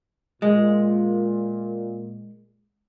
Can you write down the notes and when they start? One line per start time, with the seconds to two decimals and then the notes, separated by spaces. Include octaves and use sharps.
0.42 A#2 G#3